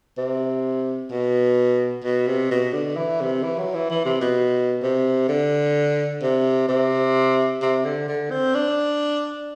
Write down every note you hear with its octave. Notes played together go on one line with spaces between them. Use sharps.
C3
B2
B2
C3
B2
D3
E3
C3
E3
F#3
E3
E3
C3
B2
C3
D3
C3
C3
C3
D3
D3
C4
D4